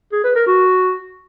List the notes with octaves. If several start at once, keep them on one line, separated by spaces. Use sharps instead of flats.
G#4
B4
A#4
F#4